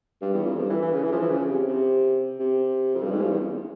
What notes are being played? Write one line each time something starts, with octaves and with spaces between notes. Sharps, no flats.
G2
E2
F2
G2
E3
E3
C#3
E3
F3
E3
C#3
C3
C3
C3
F2
G2
G#2
G2
E2